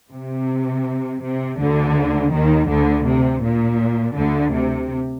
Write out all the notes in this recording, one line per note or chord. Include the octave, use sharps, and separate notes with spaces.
C3
C3
D2 D3
D#2 D#3
D2 D3
C3
A#2
D2 D3
C3